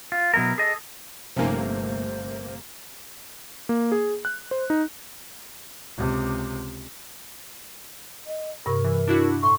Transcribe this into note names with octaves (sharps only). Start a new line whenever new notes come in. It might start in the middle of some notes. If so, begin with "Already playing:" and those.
F4
B2 F#3 B3 E4 A#4
G#4 A4 D#5
G1 C3 F3 A3 A#3 C#4 D#4 C5
A#3
G#4
F#6
C5
D#4
C#2 C3
D#5
G2 C3 A#4 C#6
E3
D4 E4 F#4
A2 C6 C#6